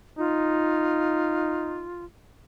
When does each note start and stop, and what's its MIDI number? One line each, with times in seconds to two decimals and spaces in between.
0.18 1.87 63
0.18 2.04 65